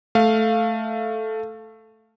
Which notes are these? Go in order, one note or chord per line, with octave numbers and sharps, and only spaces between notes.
A3 F5